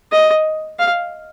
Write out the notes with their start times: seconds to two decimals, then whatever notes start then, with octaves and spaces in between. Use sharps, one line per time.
0.12 D#5
0.79 F5